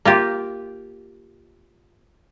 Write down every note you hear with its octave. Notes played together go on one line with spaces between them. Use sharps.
A#3 F4 G4